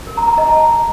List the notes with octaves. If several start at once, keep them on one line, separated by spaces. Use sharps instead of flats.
A#4
A#5
A#5
D#5
A5